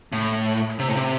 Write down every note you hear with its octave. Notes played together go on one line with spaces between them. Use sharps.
A2
C3
A2
C3